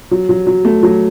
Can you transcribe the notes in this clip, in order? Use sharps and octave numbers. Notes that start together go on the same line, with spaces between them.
F#3
F#3
F#3
A3
F#3